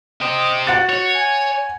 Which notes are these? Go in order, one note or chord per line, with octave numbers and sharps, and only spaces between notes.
G4 C5 D#5
F#4 F#5 A6
C#5
G#5